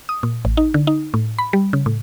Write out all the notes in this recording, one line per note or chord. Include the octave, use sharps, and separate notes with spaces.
D#6
A#2
A1
D#4
D3
D#4
A2
B5
G3
C#3
A2